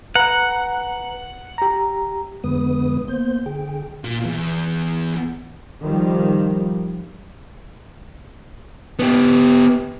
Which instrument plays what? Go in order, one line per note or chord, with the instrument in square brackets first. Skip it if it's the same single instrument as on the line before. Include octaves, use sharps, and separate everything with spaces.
[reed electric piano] B4 A#5 [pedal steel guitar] F#5
[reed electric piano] G4 A#5
[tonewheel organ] F2 D3 G#3 B3 B4 D#6
A#3 B3 C5 G6
D3 G#4 G5
[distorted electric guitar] A#2
E2
[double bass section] D#3 F3 G3
[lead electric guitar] B3 G4